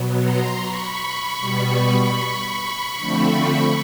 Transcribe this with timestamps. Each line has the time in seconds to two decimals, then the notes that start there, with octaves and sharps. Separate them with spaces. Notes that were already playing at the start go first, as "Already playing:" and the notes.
Already playing: B2 F#3 B3
0.21 A#5 C6
0.60 B5 C#6
1.40 B2 G3 B3
2.98 D3 F3 A3 C4